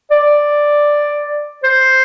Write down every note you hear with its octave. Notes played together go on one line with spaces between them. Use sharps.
D5
C5